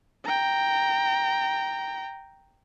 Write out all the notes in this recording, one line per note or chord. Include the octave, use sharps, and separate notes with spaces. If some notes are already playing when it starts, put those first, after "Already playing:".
G5 A#5